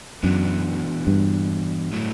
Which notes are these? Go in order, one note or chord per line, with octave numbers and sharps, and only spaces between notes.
F#2 E3 B3 D4 F#4
G2
A2 F#3 A3 E4